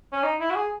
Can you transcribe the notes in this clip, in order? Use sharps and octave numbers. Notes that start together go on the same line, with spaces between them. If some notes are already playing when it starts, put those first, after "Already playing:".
C#4
D#4
E4
F#4
G#4